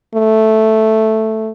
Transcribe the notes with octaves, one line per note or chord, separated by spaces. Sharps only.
A3